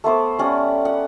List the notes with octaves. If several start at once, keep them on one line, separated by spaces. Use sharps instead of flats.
A3 B3 C5 D6
G3 C#4 D5 F#5
F#5